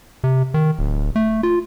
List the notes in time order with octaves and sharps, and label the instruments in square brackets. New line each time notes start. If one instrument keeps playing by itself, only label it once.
[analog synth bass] C3
D#3
D1
A3
F4